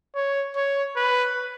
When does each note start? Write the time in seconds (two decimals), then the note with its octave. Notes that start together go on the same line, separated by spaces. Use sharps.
0.15 C#5
0.55 C#5
0.96 B4